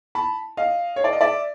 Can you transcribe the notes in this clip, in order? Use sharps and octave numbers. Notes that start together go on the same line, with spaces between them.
A5 B5
D#5 F5
C#5
D5
D#5
D5 E5